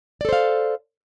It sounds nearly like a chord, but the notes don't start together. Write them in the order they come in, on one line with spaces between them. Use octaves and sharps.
D5 A4 C5 F5